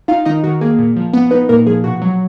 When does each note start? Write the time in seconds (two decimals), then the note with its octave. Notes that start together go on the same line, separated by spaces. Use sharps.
0.08 D#4 F4 F5
0.25 D#3 D#4 D#5
0.44 D#3 F#4
0.61 A#3 G#4
0.79 A#2
0.96 F3
1.14 B3
1.31 B3 D#4 B4
1.49 A#2 A#3 A#4
1.67 F3 G#4
1.84 B2 F#4
2.02 F#3